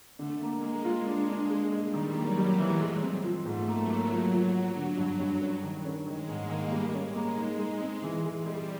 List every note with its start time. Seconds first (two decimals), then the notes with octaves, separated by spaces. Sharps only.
0.19 D3 A3
0.42 A#3
0.52 G#3
0.63 A#3
0.85 G#3 F4
1.07 D4
1.29 D4
1.50 G#3 A#3
1.72 G#3
1.83 G3
1.94 D#3
2.15 F#3 A#3
2.37 G3
2.48 G#3
2.59 E3
2.80 G#3 A3
3.02 C4
3.24 F3
3.45 G#2 A3
3.68 A#3
3.78 F#3
3.90 A#3
4.11 F3 F#3
4.33 F3
4.54 F#4
4.76 D3
4.97 G2
5.19 G2
5.41 C#4
5.63 D#3
5.85 C#4
6.07 D#3 G#3
6.29 G#2
6.39 A#3
6.50 D#3
6.72 G3 A3
6.94 C#4
7.05 G#3
7.15 A#3
7.37 D#4
7.58 G#3
7.80 C4
8.02 E3
8.25 G#3
8.35 G3
8.46 G#3